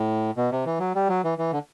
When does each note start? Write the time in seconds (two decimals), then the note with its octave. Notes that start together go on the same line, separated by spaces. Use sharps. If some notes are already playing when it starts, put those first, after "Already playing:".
Already playing: A2
0.37 B2
0.52 C3
0.66 E3
0.80 F#3
0.95 G3
1.09 F#3
1.24 E3
1.38 E3
1.52 D3